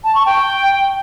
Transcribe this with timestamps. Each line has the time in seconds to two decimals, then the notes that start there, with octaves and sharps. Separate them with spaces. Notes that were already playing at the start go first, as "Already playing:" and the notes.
0.04 A5
0.15 C#6
0.26 G5